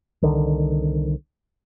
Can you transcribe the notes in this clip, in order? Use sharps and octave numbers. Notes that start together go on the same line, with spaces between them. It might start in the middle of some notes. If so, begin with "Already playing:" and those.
C2 D3 D#3